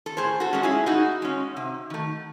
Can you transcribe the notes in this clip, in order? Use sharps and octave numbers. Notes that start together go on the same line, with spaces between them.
A4
A2 G#4 C5
F#4 A4
G#3 C#4
E4 G#4
A2 D#4 F#4
G#3 C#4
C3
D#3 A3